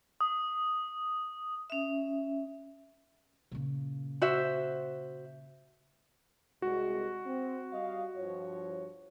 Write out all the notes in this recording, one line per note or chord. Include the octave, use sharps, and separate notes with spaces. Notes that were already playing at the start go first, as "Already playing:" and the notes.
D#6
C#4 E5
A#2 C#3
F#4 C5 E5
C2 G#3 F#4
C4
G3 D#5 F5
G2 F3 C#5